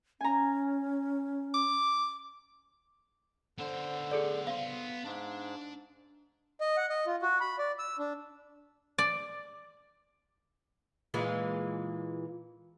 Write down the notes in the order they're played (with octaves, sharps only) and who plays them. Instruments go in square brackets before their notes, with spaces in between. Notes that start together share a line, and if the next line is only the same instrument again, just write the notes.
[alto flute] C#4 [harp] G#5 A#5
[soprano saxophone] D6
[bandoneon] D3 [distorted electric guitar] B3 C5
[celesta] G#4 A4 D5
[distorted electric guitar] B3 C6 [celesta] F5
[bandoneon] G#2 [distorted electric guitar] D4
[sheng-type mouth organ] D#5
F#5
D#5
F4
F#4
B5
D5
E6
D4
[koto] D5
[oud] A#2 E3 G#3